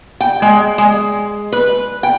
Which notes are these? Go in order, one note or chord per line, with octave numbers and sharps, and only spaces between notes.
G5
G#3
G#3
B4
G5